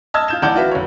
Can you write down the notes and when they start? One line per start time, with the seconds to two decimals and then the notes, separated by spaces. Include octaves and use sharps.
0.14 D#5 A5 E6 F6 G#6
0.28 F4 G6 E7
0.42 A1 D5 F#5 A5 D6 G6
0.56 F4 F#4 B4 E5
0.71 F1 C#5